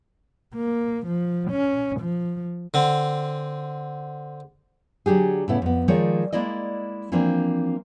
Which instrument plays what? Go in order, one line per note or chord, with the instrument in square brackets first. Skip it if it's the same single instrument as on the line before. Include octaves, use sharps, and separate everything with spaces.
[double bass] A#3
F3
C#4
F3
[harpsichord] D3 C4
[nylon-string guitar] D3 F#3 D4 G4 G#4
A2 C#3 B3 E4
F2 B3
D#3 F3 G#3 C#5 D5
G#3 A#3 E4 D5 D#5
E3 F3 A#3 C4 D4